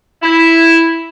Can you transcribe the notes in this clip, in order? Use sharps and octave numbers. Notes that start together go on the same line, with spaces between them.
E4